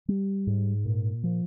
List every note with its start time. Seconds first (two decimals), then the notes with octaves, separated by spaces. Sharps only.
0.08 G3
0.47 G#2
0.85 A#2
1.23 F3